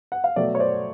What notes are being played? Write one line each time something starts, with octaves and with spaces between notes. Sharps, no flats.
F#5
F5
B2 F#3 A3 D5 E5
C#5
C5 D5